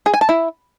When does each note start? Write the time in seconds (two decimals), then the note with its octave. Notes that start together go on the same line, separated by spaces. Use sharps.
0.06 G#4
0.14 G#5
0.21 A5
0.29 E4